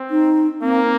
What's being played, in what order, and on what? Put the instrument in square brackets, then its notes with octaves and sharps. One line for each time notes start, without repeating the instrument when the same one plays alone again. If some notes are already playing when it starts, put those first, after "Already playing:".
Already playing: [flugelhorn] C4
[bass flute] D#4
[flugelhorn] A#3 [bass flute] C4